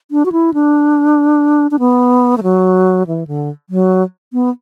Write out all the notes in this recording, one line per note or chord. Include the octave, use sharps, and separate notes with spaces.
D4
F#4
E4
D4
D4
B3
A3
F#3
E3
D3
F#3
B3